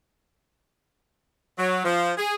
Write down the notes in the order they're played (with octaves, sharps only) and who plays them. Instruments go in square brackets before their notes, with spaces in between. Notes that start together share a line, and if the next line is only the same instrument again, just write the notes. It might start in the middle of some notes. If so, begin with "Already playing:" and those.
[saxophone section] F#3
F3
G#4